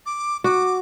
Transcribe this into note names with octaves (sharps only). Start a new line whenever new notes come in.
D6
F#4 D6